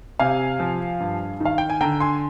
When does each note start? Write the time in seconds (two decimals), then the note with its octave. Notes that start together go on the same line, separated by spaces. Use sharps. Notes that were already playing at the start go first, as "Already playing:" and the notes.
0.20 C3 F5 G#5
0.60 F3
1.00 G2
1.40 D#3 F5
1.58 G5
1.70 G#5
1.81 D3 G5 A#5
2.00 G#5 C6